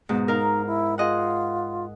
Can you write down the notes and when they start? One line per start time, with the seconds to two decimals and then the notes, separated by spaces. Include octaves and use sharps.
0.09 G#2 B2
0.28 D#4 A#4 F5
0.67 E4
0.98 F4 G#4 D#5 F#5